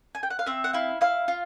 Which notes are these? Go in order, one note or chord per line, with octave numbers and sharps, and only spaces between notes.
G#5
G5
F#5
F5
C4 E5
F#5
E4 F5
E4 F5
F4